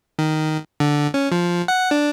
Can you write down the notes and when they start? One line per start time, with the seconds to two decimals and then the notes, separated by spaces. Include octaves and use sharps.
0.19 D#3
0.80 D3
1.14 C#4
1.32 F3
1.68 F#5
1.91 D4